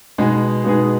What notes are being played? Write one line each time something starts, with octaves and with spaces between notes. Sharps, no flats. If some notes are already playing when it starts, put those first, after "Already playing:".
B2 G#3 B3 D#4 G#4
B2 G#3 B3 D#4 G#4